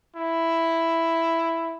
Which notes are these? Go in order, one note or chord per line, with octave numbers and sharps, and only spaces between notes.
E4